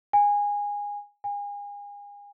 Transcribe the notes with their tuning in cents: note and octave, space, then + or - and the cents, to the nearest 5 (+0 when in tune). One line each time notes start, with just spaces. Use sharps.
G#5 -20
G#5 -35